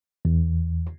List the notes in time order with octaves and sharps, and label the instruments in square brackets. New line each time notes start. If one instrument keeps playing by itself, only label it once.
[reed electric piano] E2